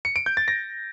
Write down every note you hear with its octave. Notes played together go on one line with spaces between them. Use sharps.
C#7
D7
G6
A6
A#6